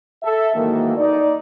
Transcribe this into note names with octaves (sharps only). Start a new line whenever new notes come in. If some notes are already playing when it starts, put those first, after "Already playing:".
A4 E5
G#2 D#3 E3 F#3 A#3
D#4 D5